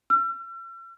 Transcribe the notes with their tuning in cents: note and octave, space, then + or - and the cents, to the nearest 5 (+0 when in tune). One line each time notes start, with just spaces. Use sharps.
E6 +45